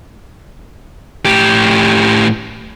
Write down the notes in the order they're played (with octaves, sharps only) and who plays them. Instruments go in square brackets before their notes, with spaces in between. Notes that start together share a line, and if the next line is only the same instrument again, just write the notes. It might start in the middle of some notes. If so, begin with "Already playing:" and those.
[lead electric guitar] A2 G4